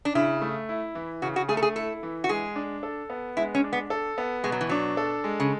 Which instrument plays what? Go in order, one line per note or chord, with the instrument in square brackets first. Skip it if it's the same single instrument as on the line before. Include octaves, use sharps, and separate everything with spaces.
[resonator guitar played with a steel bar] D4
[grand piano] C#3 [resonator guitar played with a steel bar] E4
[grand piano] A3
E4
E3
[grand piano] C#3 [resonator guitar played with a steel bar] F#4
[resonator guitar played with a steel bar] F#4
[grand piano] A3 [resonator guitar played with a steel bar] G#4
[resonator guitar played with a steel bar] A4
G#4
[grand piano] E4 [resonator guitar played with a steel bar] A4
[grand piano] E3
[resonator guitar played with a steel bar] F#4
[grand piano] G#3 [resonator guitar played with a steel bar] G#4
[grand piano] D4
A4
B3
[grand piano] G#3 [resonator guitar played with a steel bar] E4
[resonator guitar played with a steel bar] C#4
[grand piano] D4
[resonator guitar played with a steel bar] B3
[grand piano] A4
B3
[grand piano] B2 [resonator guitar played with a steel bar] G#3
[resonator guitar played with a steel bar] F#3
E3
[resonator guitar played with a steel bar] F#3 [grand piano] D4
[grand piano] A4
G#3
[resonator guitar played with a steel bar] C#3